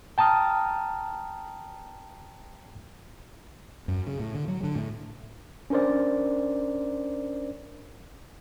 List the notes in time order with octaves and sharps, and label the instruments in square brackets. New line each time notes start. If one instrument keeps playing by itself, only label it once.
[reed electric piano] G5 A5 A#5 D#6 F6
[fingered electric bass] F#2
C#3
A2
D3
F#3
D3
A2
[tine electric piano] C#4 D4 A#4 C5 D5